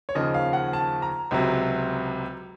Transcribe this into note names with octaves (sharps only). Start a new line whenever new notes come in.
C#5
D#2 C#3 F3 D#5
F5
F#5
A5
A#5
C#2 C3 F#3